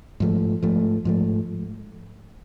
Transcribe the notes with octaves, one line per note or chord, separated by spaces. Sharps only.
G#2 F3 A3
G#2 F3 A3
G#2 F3 A3